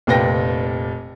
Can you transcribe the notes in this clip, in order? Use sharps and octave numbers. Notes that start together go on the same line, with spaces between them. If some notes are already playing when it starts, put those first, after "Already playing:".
F1 A#2 B4 G5 A#6